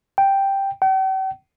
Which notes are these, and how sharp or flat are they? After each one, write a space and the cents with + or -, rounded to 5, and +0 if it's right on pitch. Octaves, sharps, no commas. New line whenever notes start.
G5 +0
G5 -45